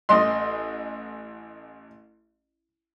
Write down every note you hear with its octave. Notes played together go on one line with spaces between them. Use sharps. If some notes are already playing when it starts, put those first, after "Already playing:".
A1 D#5 C6